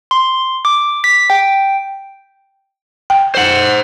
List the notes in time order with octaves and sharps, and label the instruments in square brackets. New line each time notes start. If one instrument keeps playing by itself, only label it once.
[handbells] C6
D6
B6
G5
[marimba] G5
[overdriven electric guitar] C5 F#5